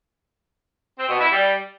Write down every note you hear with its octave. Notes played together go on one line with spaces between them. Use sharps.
C4
B2
E4
G3